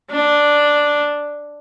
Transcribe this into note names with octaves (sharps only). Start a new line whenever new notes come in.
D4